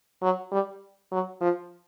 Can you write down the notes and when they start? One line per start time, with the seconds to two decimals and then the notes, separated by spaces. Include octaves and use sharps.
0.22 F#3
0.52 G3
1.12 F#3
1.41 F3